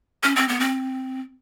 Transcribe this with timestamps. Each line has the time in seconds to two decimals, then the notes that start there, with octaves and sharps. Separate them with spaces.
0.23 C#4
0.36 C4
0.48 B3
0.60 C4